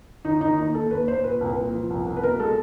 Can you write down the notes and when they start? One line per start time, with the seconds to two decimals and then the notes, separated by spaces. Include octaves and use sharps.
0.25 D#3 D#4
0.41 D#3 D#4
0.58 D#2 D#4
0.75 D#2 A4
0.90 D#2 B4
1.08 D#2 C5
1.24 A#2 B4
1.41 C2
1.49 B4
1.58 A#2
1.74 F3
1.90 C2
2.07 C2
2.16 B4
2.23 B2 A#4
2.40 G#3 A4